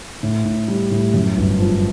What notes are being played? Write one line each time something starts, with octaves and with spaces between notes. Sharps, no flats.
A2
A2
G3
A2
F#2
G1
F3